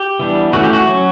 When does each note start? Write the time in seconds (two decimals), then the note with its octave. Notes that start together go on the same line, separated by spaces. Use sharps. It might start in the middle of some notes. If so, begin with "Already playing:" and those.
Already playing: G4
0.20 E3 G3 B3 D4
0.53 E3 A3 C#4 F#4
0.64 G4
0.73 F#4
0.87 F#3 C#4